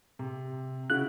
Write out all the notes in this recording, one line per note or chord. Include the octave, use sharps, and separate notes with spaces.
C3
C#3 E4 F#4 F#6